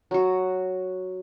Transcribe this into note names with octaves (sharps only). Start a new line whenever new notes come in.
F#3 F#4